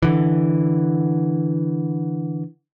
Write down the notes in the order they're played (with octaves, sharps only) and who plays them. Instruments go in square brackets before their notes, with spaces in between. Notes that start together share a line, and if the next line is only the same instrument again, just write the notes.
[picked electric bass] D3 E3